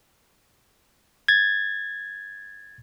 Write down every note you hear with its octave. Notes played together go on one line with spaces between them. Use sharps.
G#6 A6